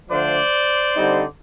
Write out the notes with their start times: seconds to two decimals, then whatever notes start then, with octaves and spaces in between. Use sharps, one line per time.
0.10 D3 F3 A3 D4 C5 D5
0.95 D3 G3 C4 D#4